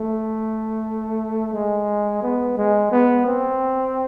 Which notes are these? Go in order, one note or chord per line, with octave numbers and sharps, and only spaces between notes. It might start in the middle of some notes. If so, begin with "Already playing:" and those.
Already playing: A3
G#3
B3
G#3
B3
C4